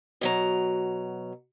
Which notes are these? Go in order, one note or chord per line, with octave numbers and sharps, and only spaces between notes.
B2 F#3 A#5